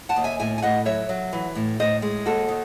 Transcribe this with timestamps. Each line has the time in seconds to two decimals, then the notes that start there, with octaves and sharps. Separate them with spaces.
0.09 F#5 A5
0.16 D#2
0.24 E5 G#5
0.40 A2 E5 G#5
0.58 G#5
0.62 A2 D#5 F#5
0.86 F#3 C#5 E5
1.09 F#3
1.33 E3
1.55 A2
1.80 A2 C5 D#5
2.02 G#3
2.26 D#2 F#4 A4
2.48 D#3